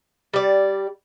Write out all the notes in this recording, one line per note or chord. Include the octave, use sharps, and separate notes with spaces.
G3 D5